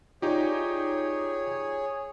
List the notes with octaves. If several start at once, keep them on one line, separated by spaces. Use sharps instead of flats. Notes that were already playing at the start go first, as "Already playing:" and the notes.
D#4 F4 G4 G#4 C#5 D5